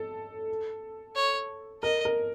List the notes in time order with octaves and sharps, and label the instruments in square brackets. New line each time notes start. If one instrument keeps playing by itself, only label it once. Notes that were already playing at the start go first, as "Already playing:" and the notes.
Already playing: [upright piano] A4
[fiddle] C#5
[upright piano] A#4 [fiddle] D#5
[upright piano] A#4